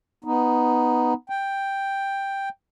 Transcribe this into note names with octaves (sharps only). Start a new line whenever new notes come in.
B3 D#4
G5